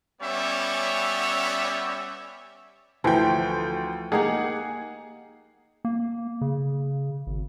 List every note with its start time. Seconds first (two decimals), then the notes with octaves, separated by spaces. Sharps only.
0.21 G3 B3 C#4 C#5 D5 E5
3.04 D2 E3 F3 G5
4.12 A#3 D#4 G4 G#4 F#5
5.85 A#3
6.41 C#3
7.27 G#1